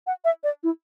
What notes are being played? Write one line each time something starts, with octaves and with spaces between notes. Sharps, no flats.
F#5
E5
D5
E4